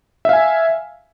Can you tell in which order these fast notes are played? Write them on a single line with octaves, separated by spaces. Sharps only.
E5 F5 G#5